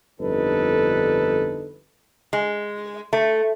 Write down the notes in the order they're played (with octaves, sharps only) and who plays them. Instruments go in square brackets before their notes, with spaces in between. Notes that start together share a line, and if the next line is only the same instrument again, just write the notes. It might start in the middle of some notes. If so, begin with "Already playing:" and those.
[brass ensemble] G1 F2 D3 D#4 A4 B4
[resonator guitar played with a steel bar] G#3
A3